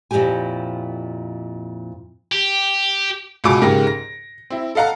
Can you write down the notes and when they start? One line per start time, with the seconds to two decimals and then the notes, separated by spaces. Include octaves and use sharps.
0.11 F2 A#2 F#3 E4 G4 G#5
2.32 G4
3.44 C#2 B2 F4 G#5 D6 D7
3.62 G#2 C#3 G4 A#4 F6 A#6
3.87 A#6
4.50 C4 E4
4.75 A4 D#5 F5 F#5 A#5